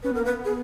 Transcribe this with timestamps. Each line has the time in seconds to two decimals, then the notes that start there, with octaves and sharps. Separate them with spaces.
0.03 C#4 B4
0.11 B3
0.14 A#4
0.20 A#3
0.25 B4
0.28 B3
0.45 G#4